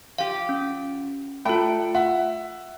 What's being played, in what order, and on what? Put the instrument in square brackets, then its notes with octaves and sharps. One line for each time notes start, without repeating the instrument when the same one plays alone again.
[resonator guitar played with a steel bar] F3 G4 [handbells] F5
[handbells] C#4
[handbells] A3 F4 [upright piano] A4 E5 B5 [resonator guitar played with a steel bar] G5
[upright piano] E5 F#5